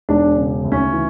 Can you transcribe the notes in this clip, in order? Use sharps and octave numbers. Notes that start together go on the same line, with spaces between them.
E1 D4
C#3
D2
C#4
E3